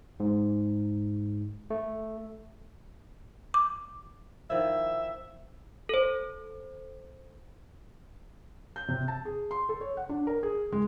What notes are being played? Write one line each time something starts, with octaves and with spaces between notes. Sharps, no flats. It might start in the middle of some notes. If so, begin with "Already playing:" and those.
G#2
A3
D6
D#3 F3 E4 E5
A4 C5
G6
C3
A5
G#4
C6
A4
C#5
F#5
D4
A#4
G#4
G#3